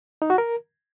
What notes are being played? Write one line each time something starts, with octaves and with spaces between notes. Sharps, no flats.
D#4
F#4
A#4